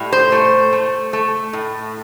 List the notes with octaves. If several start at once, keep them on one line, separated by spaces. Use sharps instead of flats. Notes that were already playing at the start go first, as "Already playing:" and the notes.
Already playing: A2 G3
C5
A3
A3
A3
A2